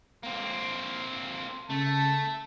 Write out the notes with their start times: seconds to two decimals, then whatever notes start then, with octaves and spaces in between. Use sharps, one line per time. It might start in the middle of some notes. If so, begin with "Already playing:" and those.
0.23 A#3 C4
1.70 C#3 A3 A5